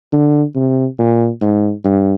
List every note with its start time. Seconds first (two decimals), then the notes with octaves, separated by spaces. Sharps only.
0.13 D3
0.56 C3
0.99 A#2
1.41 G#2
1.85 G2